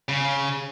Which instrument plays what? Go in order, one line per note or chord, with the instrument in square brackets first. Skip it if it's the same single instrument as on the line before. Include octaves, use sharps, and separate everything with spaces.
[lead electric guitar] C#3